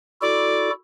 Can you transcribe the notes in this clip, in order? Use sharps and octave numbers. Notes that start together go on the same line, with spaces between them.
E4 F#4 A4 D5